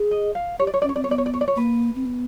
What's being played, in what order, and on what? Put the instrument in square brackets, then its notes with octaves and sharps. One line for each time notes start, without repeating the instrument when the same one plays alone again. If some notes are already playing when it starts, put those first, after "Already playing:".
Already playing: [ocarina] G#4
[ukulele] D#5
F5
[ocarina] G4 [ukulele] C#5
[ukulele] D5
C#5
[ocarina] C#4 [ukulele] D5
[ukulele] C#5
[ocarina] C4 [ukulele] D5
[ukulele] C#5
[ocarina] B3 [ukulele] D5
[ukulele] C#5
D5
C#5
D5
C#5
[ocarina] A#3 [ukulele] B4
[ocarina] C4
B3